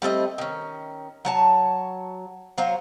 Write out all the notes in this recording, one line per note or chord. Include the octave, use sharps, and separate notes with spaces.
G3 A3 C4 D#5
D#3 C#4
F#3 C#5 A5
F#3 C5 C#5 F5